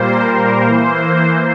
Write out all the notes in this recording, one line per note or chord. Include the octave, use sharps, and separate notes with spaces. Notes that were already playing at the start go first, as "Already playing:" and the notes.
Already playing: A#2 G3 A#3 C5
A#4
E3 A#3 C5